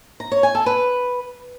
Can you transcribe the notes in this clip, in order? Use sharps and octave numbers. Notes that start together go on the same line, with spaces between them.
A#5
C#5
G#5
A4
B4